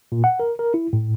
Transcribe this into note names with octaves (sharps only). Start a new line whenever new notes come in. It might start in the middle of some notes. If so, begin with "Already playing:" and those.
A#2
F#5
A#4
A#4
E4
A2